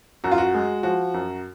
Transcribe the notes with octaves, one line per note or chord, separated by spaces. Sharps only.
F#2 F#4
F4
F#4
G#3
F3 F#4
F#2